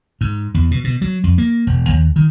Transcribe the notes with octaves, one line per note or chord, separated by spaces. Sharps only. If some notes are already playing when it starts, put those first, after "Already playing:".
G#2
E2
B2
B2
F#3
F2
A#3
E1
D#2
D#3